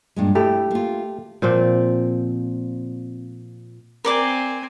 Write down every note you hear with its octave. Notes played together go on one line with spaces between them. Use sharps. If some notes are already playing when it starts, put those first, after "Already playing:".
G2 A#2 G#3
A3 E4 G4
A#3 F4
A#2 F3 C4
C4 A#4 D5 G#5 D6